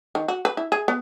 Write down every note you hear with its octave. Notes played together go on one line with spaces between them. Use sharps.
D#3
F#4
B4
E4
G#4
B3